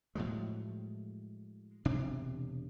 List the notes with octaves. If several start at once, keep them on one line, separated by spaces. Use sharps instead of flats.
A2 F3 F#3 G#3
E1 C3 D4